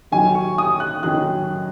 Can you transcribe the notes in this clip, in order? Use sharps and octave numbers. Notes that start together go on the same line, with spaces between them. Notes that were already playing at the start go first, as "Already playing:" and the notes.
F#2 D#3 F#3 G#5
C#6
D#6
F#6
F#2 D#3 F#3 F#6